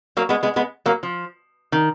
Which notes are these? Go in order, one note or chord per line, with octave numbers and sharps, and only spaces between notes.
F#3 A#3
G#3 B3
G#3 B3
G#3 B3
F#3 A#3
F3
D#3